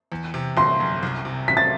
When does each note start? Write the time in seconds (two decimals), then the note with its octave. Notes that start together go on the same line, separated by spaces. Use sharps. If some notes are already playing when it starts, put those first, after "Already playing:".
0.12 E2
0.34 C3
0.57 G1 C6
0.80 F#2
1.03 C2
1.25 C3
1.48 A1 B6
1.57 A6